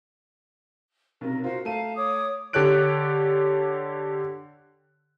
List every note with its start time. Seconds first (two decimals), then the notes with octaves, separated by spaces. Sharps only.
1.21 B1 C3 A#4
1.44 F4 F#4 A#4 C5 F5
1.65 A3 F5 A5 A#5 D#7
1.96 C#5 D6 D#6
2.53 D3 G4 A4 C#5 F#6 D7